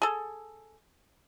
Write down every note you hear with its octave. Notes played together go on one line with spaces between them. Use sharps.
G#4 A4